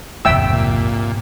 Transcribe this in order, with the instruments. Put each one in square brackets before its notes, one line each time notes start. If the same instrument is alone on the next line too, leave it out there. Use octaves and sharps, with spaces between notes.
[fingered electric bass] D#1 A#1 F2 [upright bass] G#2 C3 [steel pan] E5 G5 E6
[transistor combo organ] A#2